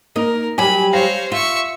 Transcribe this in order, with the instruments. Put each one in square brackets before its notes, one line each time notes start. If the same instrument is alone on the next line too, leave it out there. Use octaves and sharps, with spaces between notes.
[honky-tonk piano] A#3 [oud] D#4 [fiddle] A#4
[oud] F#3 G3 G4 [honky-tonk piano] G#5 [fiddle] B5
[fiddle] C5 C#5 [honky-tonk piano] F5 A#6
[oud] F4 [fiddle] E5 C#6